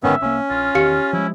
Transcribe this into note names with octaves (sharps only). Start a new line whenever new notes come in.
F#1 G#2 D3 D#3 B3 C#4 E5
C2 A#3 C#4
A#1 F4
E2 D#3 G4 F5 C#7
F3 G#3 E4